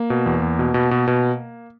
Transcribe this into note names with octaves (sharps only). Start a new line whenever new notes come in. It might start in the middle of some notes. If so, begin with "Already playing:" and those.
Already playing: A#3
B2
E2
E2
B2
B2
B2
B2